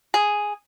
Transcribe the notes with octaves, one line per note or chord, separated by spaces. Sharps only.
G#4